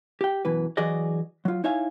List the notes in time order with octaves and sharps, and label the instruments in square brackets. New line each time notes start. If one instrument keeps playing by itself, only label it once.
[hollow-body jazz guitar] G4 G5
F#2 B2 E3 B4
E3 F#3 F#4 G#4 D5 D#5
F#3 F4
D#4 E4 C#5 E5 F5 G#5